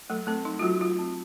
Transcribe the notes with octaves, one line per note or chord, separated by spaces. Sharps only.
F#3 A3 A4
A3 C4 A4
F#3 D#4
F4
F#3 A3 F#4
F#3 F4
C4